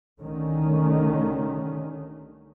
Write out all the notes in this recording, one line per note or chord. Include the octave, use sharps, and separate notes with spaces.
C2 D3 D#3 A3 C#4